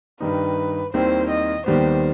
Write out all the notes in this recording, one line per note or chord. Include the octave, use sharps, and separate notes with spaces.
G2 D#3 G3 D#4 B4
D#2 D#3 G3 C4 E4 C5
D#5
D#2 D#3 G3 B3 C5